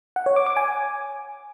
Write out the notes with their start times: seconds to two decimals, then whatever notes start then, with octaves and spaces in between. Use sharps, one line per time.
0.16 F#5
0.26 C#5
0.36 D6
0.46 D6
0.57 G#5